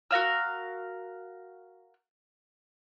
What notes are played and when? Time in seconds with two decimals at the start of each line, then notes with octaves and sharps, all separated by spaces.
0.11 F#4 A#4 F5 E6